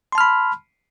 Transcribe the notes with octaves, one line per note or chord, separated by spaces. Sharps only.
A5 B5 C6 F6